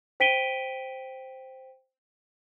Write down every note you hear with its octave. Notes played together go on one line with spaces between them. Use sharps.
C5 G5 B6 D7 D#7 G7